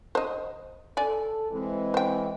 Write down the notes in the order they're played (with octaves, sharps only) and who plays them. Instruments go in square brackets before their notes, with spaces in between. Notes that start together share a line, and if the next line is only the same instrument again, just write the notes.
[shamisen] C5 D#5
[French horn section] A4 [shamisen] D5 G#5
[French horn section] E3 G#3 C4
[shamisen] C5 G5